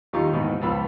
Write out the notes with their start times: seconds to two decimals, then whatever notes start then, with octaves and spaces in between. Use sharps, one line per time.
0.13 D#2 D#3 G3 F4 A#5 C#6
0.33 D#2 G#2 B2 D#3 E3
0.61 C#2 F3 B3 F4 B5 E6